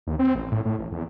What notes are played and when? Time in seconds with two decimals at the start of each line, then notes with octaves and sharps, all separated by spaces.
0.07 D#2
0.19 C4
0.35 A1
0.52 A2
0.65 A2
0.79 A1
0.92 E2